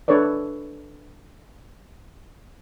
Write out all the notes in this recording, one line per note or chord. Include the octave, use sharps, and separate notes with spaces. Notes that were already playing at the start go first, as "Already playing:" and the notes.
D4 A4 B4 C#5 D5